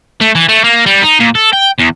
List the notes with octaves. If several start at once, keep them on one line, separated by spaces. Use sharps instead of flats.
A3
E3
A3
A#3
G3
D#4
A#2
A4
G5
E2